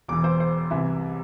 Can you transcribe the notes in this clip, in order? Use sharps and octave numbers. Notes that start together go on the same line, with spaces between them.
E1 E2 E3 D6
C5
C5
C2 C3 E3 E5